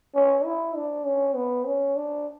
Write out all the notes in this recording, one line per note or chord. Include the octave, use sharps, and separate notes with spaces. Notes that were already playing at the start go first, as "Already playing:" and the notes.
C#4
E4
D4
C#4
B3
C#4
D4